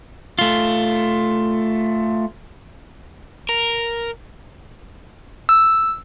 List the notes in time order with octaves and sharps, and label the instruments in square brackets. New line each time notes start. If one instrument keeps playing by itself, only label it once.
[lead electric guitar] A3 F4
[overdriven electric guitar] A#4
[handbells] E6